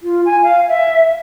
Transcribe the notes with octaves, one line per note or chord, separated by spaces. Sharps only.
F4
G#5
F5
E5